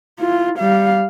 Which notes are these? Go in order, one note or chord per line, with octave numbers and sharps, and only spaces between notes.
E4 F4
G3 F5